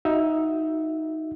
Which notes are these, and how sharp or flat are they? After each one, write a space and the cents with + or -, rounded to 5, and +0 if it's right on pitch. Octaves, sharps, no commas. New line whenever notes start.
D#4 +15 F#4 +0 E5 +0